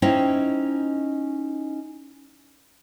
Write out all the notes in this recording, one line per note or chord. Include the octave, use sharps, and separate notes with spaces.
C#4 D#4 E4 C5 D#5 G5